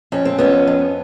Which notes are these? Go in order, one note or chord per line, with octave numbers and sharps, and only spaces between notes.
F2 C#4
C4
F2 B3 C#4
F2